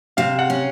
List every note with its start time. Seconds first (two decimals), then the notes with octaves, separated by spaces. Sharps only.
0.17 C3 F5
0.39 F#5
0.50 C#4